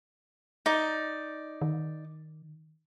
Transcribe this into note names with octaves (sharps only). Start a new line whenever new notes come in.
D#4 D5
D#3